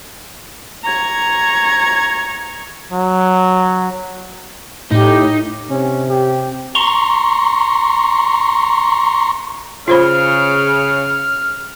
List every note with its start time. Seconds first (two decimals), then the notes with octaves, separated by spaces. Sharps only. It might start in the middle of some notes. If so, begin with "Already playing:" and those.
0.84 A#5 C#6 G#6
2.92 F#3
4.92 A2 D#4 G4
5.70 C3 C#4
6.10 G4
6.75 A#5 C6 C#6
9.88 C#3 F4 G#4 C5 B5 F6